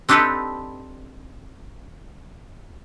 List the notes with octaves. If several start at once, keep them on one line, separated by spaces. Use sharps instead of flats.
C4 D4 D#4 G4 A4 B4